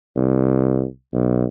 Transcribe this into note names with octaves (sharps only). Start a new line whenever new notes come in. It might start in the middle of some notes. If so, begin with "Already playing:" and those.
C2
B1